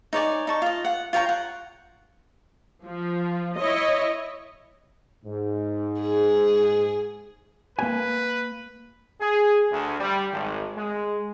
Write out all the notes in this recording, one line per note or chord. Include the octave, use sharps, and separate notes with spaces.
D#4 C#5 D5 G#5
D#4 A5 C#6
F4 D#5
F#5
F4 C#5 G5 A#5
F#5
F3
E4 C#5 D#5
G#2
G#4
A#3 B4 G#5
G#4
D2
G3
G#1
G#3